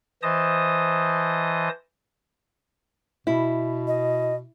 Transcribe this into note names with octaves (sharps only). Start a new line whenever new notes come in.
E3 C5 D#5 A5 D#6
B2 E4
D#5